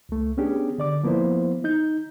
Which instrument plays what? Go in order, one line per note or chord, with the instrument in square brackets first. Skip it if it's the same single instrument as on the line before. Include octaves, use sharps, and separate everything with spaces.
[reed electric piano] C#2 A3
B3 C#4 D4 G4 G#4
D3 D5 D6
F3 A#3 B3 E4 C5
D#4 G6